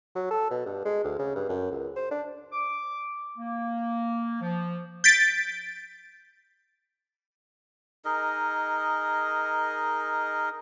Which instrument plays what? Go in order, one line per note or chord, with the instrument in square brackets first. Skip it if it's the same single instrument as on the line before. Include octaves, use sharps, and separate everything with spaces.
[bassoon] F#3
A4
B2
G2
G#3
D2
C#3
G2
F#2
C#2
C5
D4
[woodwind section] D6
A#3
F3
[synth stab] G6 A6 B6 D7
[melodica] D#4 G#4 A#4 D#5